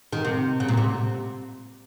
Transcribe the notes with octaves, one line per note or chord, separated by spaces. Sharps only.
D#3
C3
C#3
A#2
C3